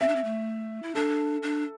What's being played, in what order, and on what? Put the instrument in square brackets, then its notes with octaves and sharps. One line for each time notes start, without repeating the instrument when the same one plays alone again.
[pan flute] C4 [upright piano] E5
[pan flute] D4
C4
A3
E4
[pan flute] D4 [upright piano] A4
[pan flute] D4